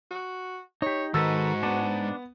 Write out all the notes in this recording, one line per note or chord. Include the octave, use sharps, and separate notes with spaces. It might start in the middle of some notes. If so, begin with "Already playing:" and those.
F#4
D#4 G4 C#5
G#2 D#3 F#4 A4 B4 E6
B3 D4